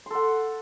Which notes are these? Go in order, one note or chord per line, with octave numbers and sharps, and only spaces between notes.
A4 F#5 C6